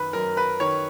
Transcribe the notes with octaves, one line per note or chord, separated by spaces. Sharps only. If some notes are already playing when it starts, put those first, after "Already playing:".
Already playing: F#2 D#3 B4
F#2 A#4
B4
D#3 C#5